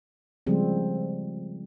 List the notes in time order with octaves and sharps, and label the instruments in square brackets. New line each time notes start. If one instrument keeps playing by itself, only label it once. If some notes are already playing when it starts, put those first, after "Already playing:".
[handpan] C#3 F3 G3 G#3 C4